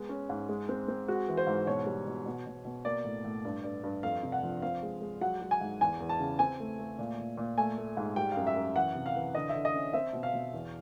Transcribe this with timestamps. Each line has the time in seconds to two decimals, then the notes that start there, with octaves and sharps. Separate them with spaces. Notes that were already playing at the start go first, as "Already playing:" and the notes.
Already playing: G#3 B3
0.09 C#4
0.29 G#2
0.49 G#3
0.69 C4
0.88 C4
1.08 G#3 F#4
1.28 E3
1.37 C5
1.47 G#2
1.67 B2 C#5
1.86 G3
2.07 B2
2.26 B2
2.46 B2
2.65 B2
2.85 A#3 D5
3.04 A2
3.24 A2
3.45 G2
3.64 G2
3.84 G2
4.03 F2 F5
4.23 C3
4.32 F#5
4.43 F3
4.62 C4 F5
4.83 G#3
5.01 G#3
5.21 F#3 F#5
5.41 F#3
5.51 G#5
5.61 G#2
5.81 E2 G#5
6.00 E2
6.09 A5
6.20 C#3
6.39 C4 G#5
6.60 A3
6.79 A3
6.99 A#2
7.18 A#2
7.37 A#2
7.57 A3 G#5
7.77 A3
7.97 G#2
8.16 G3 G5
8.32 F#2 F5
8.47 E5
8.56 F#2
8.75 E3 F#5
8.95 C3
9.06 F5
9.16 E3
9.35 D3 D#5
9.49 D3 E5
9.65 D#5
9.74 C#4
9.93 C4 E5
10.13 B2
10.23 F5
10.33 B2
10.53 E2